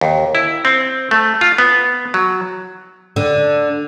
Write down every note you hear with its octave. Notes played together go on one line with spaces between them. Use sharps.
D#2
E4
C4
A3
F4
B3
F#3
D3